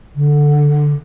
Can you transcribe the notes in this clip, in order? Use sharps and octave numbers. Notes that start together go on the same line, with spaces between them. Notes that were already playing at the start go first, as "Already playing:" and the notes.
D3